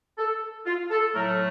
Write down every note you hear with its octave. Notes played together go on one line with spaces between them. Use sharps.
A4
F4
A4
A2 F#3 A3 A#4